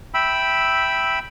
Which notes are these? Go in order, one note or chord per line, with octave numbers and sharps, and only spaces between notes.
E5 G5 B5 E6